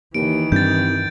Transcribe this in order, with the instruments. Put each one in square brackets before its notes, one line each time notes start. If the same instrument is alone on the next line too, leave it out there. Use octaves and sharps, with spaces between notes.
[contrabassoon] D#2 [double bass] D#3 E3 [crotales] D7
[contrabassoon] C2 [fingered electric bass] G2 G3 D4 [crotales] G6 A6